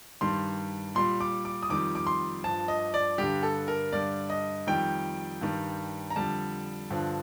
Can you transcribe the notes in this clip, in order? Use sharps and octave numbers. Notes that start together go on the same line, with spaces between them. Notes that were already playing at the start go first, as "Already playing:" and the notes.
G2 D#3 G3 C6
A#2 G3 C6
D6
D6
D#6
F2 D#3 G3 D6
D6
C6
G2 F3 A5
D#5
D5
G2 D3 G3 G4
A4
A#4
G2 D3 G3 D5
D#5
F2 D#3 G3 G5
G2 D#3 G3
A#5
F2 D3 G3 A5
G2 D3 F3